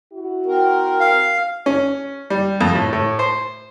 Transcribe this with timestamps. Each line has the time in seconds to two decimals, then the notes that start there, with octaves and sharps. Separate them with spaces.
0.13 E4 F#4
0.46 C4 A#4
1.00 F5
1.66 C#4
2.30 G3
2.61 F2
2.75 A2
2.93 A2
3.19 C5